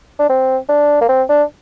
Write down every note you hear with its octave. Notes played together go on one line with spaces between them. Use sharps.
D4
C4
D4
A#3
C4
D4